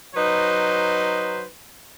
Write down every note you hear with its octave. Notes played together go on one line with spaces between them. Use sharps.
F#3 D#4 B4 C5